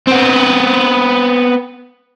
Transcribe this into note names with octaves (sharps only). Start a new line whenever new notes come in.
B3 C4